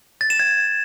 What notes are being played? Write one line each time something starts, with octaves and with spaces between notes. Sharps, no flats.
A6
E7
G#6